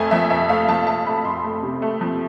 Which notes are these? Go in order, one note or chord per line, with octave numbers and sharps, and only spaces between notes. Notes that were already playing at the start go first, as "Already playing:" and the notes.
Already playing: F2 A3 G#5
F3 E5
F2 E5
A3 F5
F3 A5
A3 A5
A3 B5
F2 C6
A3
C3
A3
F3